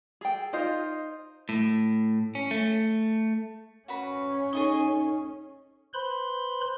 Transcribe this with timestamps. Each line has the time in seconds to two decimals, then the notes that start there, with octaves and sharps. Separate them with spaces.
0.21 G#4 A4 G5
0.53 D#4 F4 C5 D#5
1.49 A2
2.35 C#4
2.51 A3
3.88 C#4 F#4 B4 B5
4.53 D#4 G#4 A4 D#5 C#6
5.94 B4 C5 B5 C6